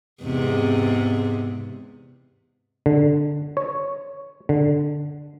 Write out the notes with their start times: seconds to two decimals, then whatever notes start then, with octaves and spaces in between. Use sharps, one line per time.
0.23 E2 G#2 C3
2.86 D3
3.57 C#5
4.49 D3